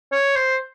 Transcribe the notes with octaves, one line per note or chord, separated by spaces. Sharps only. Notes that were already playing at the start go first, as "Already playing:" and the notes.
C#5
C5